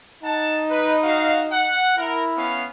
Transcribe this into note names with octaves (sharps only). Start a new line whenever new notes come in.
D#4 F#5 A5
B4
F#4 F5
F#5
E4 A#4
B3 C#4 F5